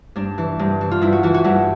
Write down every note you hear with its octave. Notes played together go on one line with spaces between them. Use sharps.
G2 D4
E3
G2
E3
F4
G2 E4
F#4
E3 F#4
F#4
G2 E4